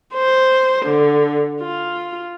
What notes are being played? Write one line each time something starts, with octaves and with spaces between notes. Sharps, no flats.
C5
D3
F4